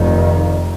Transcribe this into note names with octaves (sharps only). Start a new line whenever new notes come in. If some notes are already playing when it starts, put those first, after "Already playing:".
Already playing: F1 F2 D#3